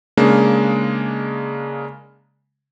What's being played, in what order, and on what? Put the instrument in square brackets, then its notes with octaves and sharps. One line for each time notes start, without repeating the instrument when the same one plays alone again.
[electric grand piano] C#3 G#3 A#3 D4